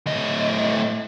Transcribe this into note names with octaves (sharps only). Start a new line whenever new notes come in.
A2 D#5